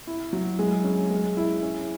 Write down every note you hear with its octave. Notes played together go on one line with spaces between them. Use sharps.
E4
F#3
G#3
C#4
G#3
E4
C#4